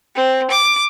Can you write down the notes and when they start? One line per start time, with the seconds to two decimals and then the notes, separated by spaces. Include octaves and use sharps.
0.15 C4
0.51 D6